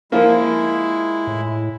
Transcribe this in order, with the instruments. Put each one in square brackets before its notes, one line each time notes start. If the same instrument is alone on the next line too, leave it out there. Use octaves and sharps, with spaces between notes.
[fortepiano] F3 A#3 [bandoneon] G#3 E4
[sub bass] A2